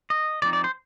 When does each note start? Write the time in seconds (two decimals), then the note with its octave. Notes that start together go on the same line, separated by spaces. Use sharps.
0.10 D#5
0.42 F3 C4 D#4 D5
0.53 D5
0.64 C5